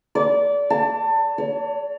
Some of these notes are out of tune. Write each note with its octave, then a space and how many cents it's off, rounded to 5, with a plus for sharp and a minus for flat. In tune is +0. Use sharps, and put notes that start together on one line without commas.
D5 -25
A5 +25
C#5 +35